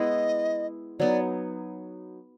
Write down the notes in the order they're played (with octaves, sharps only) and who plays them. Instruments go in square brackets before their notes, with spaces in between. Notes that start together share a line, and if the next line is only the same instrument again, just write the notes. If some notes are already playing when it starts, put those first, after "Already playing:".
Already playing: [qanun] G#3 B3 E4 [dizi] D#5
[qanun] F#3 B3 D#4 [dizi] D5